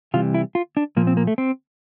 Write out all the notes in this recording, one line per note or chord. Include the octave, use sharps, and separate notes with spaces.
C3 E3 G3 F4
E4
F4
D4
A#2 F3 A#3
C4
A#3
A3
C4